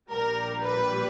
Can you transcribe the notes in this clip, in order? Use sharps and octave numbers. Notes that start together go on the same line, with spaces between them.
A#1 A#2 G3 A#4
B4